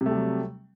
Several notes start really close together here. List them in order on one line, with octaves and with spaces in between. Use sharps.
C3 A3 G3 F#3